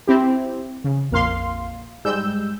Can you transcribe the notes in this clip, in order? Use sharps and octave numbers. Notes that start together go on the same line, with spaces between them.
C4 E4 G4
C#3
A#1 F2 A#3 F5 C6
G#2 G3 G#3 E6 G6